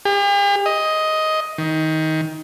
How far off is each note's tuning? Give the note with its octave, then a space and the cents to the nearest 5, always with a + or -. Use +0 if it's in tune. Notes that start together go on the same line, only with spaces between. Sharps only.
G4 +45
D#5 +10
D#3 +20